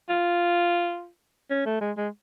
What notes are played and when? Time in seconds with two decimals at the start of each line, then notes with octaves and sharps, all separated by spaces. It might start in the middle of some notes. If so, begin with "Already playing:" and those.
0.09 F4
1.50 C#4
1.66 A3
1.81 G#3
1.98 G#3